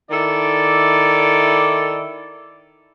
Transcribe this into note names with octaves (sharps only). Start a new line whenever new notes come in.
D#3 E4 A4 D5